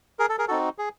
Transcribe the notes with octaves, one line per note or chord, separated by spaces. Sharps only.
G#4 A#4
A4
G#4 A#4
C4 D#4 F#4 A4
G#4